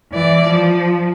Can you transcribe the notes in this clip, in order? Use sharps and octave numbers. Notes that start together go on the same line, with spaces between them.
E3 D5
F3